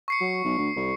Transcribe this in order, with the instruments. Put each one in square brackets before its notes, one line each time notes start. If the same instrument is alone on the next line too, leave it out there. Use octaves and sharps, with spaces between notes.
[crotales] C#6 C7 C#7
[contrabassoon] F#3
B1
D2
C2